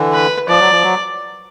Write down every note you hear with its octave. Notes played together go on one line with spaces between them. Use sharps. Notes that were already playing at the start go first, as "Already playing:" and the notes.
Already playing: D3 E3
B4
F3 D5
F#3
F3
F#3